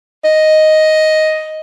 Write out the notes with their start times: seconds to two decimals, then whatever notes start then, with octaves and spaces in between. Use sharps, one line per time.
0.24 D#5